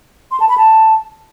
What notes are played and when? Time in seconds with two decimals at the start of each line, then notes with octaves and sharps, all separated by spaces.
0.31 C6
0.40 A5
0.49 B5
0.58 A5